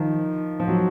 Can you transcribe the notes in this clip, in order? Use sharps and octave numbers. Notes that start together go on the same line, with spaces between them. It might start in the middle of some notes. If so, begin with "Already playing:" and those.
Already playing: D#3 F3
F3
F#3